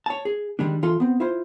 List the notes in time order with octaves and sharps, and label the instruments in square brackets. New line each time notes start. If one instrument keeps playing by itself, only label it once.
[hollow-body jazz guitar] C#5 A5
G#4
D#3 G3 G#3 D4
E3 F4 A4 C6
B3 C4
E4 F4 C5